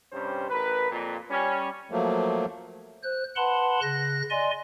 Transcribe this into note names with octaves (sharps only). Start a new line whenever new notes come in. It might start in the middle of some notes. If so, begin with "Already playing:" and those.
G2 C3 G3 C#4 C5
A1 A#4 B4
F2 A#2
G3 C#4
F3 F#3 A3 A#3
C5 F#6
B4 F#5 A5 B5 C6
C#3 F#6 A#6
D5 D#5 G#5 C6